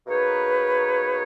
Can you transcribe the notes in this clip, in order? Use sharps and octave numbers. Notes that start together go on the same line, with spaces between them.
B2 A#3 D#4 G#4 B4 C#5